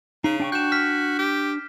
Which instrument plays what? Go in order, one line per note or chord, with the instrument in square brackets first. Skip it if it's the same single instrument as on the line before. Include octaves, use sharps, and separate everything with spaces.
[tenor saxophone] C#3 [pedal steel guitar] D#4 [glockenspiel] C7
[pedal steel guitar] D4 G5 C#6
[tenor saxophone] F#4 [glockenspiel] G6 E7
[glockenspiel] F6 B6
[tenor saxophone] G4